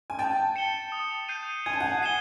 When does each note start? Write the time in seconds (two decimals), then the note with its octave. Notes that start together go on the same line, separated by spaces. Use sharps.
0.10 G#5
0.19 G5 A5 A6
0.56 C#7 E7 G7
0.92 D#6
1.29 G6 C7 D#7
1.66 G#5 G#6
1.73 A5
1.80 F#5 G#5
2.03 C7 E7 G7